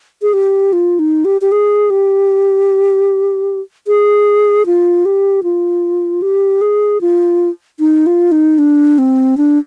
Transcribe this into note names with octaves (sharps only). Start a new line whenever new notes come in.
G#4
G4
F4
D#4
G4
G4
G#4
G4
G#4
F4
G4
F4
G4
G#4
F4
D#4
F4
D#4
D4
C4
D4